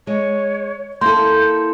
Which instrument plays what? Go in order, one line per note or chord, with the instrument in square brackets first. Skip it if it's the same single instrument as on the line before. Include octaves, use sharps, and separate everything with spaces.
[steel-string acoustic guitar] G#3 [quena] C#5
[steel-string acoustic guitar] A#3 E4 A4 [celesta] C6 [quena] G6